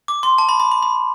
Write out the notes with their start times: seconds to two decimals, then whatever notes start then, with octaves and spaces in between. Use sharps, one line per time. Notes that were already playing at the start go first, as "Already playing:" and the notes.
0.08 D6
0.23 C6
0.38 A5
0.49 B5
0.60 B5
0.71 B5
0.83 B5